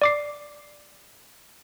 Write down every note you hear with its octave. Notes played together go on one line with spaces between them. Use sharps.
D5 D6 C7